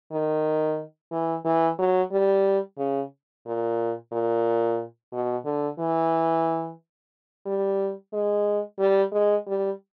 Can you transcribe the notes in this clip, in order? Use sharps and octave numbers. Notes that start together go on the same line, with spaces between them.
D#3
E3
E3
F#3
G3
C#3
A#2
A#2
B2
D3
E3
G3
G#3
G3
G#3
G3